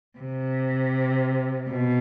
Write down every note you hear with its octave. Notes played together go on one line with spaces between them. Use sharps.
C3
B2